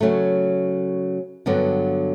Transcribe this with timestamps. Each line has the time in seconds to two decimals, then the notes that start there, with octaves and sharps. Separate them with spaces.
0.01 C#3 F#3 A3
1.46 G2 D3 F#3 B3